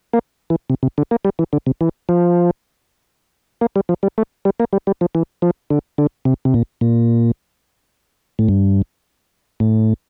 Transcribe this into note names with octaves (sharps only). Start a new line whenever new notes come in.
A#3
E3
C3
C3
D3
A#3
G3
E3
D3
C3
E3
F3
A#3
G3
F3
G3
A3
G3
A#3
G3
G3
F3
E3
F3
D3
D3
C3
C3
A#2
A#2
A2
G2
A2